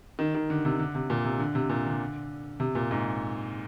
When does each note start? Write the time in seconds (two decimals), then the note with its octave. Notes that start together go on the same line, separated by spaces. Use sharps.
0.19 D#3
0.35 D#3
0.50 D3
0.65 C3
0.79 D3
0.95 C3
1.10 A#2
1.25 C3
1.40 D3
1.55 C3
1.69 A#2
1.86 D3
2.60 C3
2.75 A#2
2.91 G#2